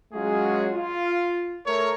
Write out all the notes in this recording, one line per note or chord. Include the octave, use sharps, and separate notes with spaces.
F#3 G#3 C#4 F4 F#4 G#4
F4
A3 A#4 C#5